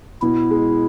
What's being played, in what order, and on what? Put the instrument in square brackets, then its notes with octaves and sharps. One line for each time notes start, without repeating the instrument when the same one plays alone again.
[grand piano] B2 [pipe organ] E4
[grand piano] G#3